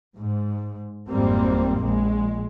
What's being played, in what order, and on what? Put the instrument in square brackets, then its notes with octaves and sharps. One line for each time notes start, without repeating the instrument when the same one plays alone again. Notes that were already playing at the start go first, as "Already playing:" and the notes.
[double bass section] G#2
G#1 F2 G3 A#3 C4
A#1 G#3